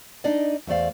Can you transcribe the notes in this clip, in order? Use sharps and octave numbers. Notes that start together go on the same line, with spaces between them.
D4 D#4 D5 D#5
E2 A3 C5 D5 F5